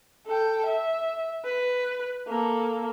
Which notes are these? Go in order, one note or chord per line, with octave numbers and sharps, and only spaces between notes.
A4 G5
E5
B4
A#3 A4